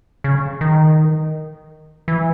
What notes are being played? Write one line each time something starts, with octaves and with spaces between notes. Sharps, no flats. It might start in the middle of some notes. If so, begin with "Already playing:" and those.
C#3
D#3
E3